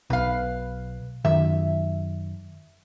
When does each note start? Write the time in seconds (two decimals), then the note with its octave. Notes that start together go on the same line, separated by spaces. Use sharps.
0.10 B1 B4 F5
1.25 F#2 D#3 E5